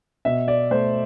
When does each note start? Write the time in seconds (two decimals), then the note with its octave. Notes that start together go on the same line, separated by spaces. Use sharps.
0.25 B2 E5
0.48 D5
0.71 A3 C5